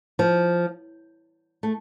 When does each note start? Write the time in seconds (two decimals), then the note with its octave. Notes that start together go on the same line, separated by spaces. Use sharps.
0.19 F3
1.63 A3